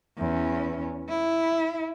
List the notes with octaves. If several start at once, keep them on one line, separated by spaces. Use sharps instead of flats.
E2 C#4
E4